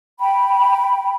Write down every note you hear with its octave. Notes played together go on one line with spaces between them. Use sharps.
G5 B5